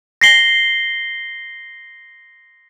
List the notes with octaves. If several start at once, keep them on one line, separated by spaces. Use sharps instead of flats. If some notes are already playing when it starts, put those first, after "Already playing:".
A#6 C7 G7